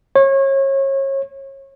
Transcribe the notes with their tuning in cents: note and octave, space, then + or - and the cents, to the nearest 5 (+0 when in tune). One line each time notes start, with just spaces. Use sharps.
C#5 -30